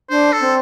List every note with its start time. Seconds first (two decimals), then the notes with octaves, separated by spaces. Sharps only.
0.10 D4 C5
0.33 A4
0.41 C4